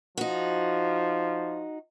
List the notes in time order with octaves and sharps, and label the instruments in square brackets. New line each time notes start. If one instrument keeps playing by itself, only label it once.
[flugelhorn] F3 [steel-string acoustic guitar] D#4 F#4